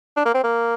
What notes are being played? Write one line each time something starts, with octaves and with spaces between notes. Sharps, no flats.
D4
A#3
C4
A#3